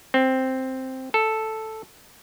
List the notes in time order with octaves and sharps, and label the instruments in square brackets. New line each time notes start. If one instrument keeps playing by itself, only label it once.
[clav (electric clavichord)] C4
A4